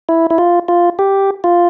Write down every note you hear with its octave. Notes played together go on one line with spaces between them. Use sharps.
E4
E4
F4
F4
G4
F4